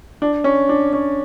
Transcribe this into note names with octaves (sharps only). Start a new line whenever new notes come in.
D4
C#4
D4
C#4